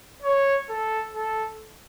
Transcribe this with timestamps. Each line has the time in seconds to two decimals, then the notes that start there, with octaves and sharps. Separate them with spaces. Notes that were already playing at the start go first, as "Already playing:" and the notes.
0.22 C#5
0.69 A4
1.15 A4